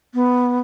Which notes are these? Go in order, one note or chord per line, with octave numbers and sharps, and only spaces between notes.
B3